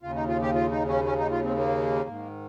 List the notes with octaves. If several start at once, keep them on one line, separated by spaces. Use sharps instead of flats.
D#2 C#3 F4
D#4
F4
G4
F4
D#4
C#4
C#4
D#4
F4
C4
A#3
G#2 D#3